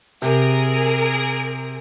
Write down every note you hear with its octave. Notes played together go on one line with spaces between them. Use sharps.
C3 G#4 A#4 D7